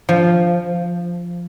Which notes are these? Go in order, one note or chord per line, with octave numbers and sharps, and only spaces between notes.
F3